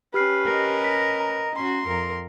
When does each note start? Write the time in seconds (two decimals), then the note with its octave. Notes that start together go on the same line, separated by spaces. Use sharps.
0.14 C#4 G4 B4 F6 C7
0.45 A#4 D#5
0.84 B6
1.20 A#5
1.56 C#4 F#4 C6
1.87 F2 A#4